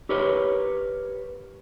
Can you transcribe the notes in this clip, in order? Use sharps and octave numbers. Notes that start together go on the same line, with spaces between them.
G4 A#4 B4 C#5